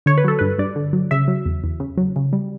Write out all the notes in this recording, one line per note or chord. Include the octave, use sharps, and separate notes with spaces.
D3 C#5
B4
F#3 A4
G2 B4
G2 D5
D3
F#3
C#3 E5
F#3
E2
E2
C#3
F#3
C#3
G3